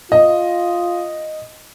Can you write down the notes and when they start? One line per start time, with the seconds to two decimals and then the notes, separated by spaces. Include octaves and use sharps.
0.12 F4 D#5